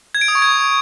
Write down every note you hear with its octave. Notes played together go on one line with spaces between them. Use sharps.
G#6
D7
D#6
C#6
G#6